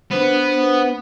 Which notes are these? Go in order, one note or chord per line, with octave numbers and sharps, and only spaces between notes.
B3 D4 B4 C5